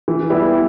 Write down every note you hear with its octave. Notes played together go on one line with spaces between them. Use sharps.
E3
G3 B3 E4 G4